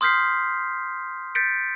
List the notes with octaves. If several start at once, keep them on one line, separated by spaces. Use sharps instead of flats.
C6 D#6 F6 G6 B6 C7
G6 A6 B6 C#7 D7